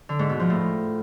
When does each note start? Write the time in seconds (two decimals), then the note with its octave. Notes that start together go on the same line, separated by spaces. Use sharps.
0.09 D3
0.19 G#2
0.29 B2
0.40 F3
0.50 A2